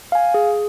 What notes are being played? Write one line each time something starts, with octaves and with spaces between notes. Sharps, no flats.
F5 G#5
G#4